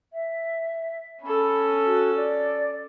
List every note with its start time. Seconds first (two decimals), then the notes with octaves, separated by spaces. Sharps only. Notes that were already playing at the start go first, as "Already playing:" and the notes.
0.13 E5
1.23 C#4 A4 B5
1.85 F#4
2.16 D5